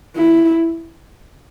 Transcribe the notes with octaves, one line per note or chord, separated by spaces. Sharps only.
E4